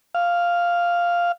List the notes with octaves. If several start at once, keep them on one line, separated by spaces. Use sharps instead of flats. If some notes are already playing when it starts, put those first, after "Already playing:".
F5